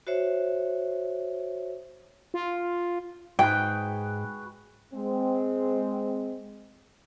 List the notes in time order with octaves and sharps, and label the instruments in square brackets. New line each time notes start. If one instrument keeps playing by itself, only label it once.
[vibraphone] F#4 C5 C#5 E5
[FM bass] F4
[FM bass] G#2 [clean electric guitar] F#4 G#4 B4 [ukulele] G5
[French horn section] G#3 C4